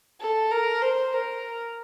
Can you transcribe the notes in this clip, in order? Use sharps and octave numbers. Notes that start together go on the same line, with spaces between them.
A4
A#4
C5
A#4